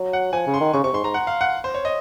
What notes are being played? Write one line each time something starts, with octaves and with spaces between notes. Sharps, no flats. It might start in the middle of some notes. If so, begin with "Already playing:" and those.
Already playing: F#3
F#5
F3 G#5
C#3
C6
D#3
C#3 C#6
C3 C#6
G#2 C6
G#2 A#5
F#5
F5
F#5
C5
C#5
D#5